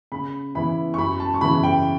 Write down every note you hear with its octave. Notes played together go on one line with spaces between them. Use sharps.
C#3 B5
E3 B3 E4 B5
C#6
F#2 B5
A5
C#6
C#3 E3 B3 E4 B5
G5